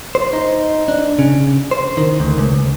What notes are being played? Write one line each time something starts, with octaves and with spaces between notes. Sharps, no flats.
C5
D#4
D4
C#3
C5
D#3
D2
C#2